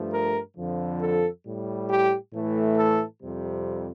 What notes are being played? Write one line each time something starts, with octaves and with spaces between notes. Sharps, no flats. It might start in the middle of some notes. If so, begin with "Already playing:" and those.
Already playing: G2 F3 A3
A#4
F2 D3 F3
A4
A2 G3
G4
A2 E3 A3
A4
F2 C3 G3